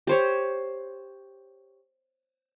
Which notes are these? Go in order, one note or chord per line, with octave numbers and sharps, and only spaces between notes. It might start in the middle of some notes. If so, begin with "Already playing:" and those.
G4 C5 C#5